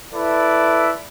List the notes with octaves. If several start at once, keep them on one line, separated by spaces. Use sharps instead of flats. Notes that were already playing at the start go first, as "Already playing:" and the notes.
E4 A4 B4 D5 E5